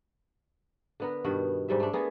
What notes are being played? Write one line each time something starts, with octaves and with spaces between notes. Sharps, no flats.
D3 B3 A#4
G2 B2 D#3 F#4
G#2 G3 E5
A3 D4
A3 B3 G#4 A#4